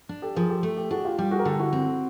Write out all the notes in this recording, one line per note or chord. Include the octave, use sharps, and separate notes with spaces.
D4
G4 A4
F3 G#4 A#4
G4 A4
A3
G4 A4
D4 F#4 G#4
F4 G4
G3 F4 G4
F#4 G#4
A#4
D3 G4 A4
E4 F#4
C4